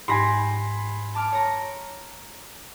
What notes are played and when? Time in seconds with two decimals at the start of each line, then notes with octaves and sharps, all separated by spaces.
0.08 G#2 G4 G#5 B5 C6 A#6
1.15 A5 D6 F6
1.32 C#5 A#5